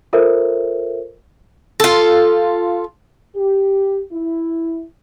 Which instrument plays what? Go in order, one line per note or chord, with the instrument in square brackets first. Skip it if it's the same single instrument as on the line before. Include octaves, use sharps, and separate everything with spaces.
[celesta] F4 A4 A#4 C5 E5
[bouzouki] F4 A4
[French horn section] G4
E4